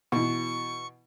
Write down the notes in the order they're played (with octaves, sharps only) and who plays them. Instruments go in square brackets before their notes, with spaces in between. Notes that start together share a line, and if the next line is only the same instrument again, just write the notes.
[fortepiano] B2 E3 [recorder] C#6